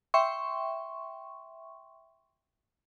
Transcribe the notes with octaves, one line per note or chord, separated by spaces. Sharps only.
E5 G5 C6 C#6